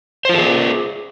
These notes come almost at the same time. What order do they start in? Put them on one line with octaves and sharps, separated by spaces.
C5 F4 A4 G#4